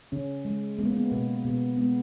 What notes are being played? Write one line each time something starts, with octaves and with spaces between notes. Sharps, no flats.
C#3 C#4
G#3
G#3 B3
A#3
B3
B2 A#3
B2 B3
G#3 B3